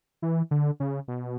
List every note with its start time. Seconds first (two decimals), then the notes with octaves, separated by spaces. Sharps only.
0.22 E3
0.51 D3
0.80 C#3
1.08 B2